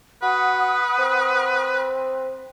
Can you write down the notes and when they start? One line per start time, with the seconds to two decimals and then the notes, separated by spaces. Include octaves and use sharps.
0.22 F#4 B4 F#5 D#6
0.98 C4